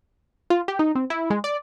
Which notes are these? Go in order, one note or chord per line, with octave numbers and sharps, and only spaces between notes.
F4
G4
D#4
C4
E4
G#3
D5